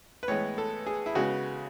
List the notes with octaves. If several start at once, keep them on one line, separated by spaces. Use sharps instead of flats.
B4
A2 E3 G#3 B3 C#5
A4
G#4
E4
C#3 G#3 B3 F#4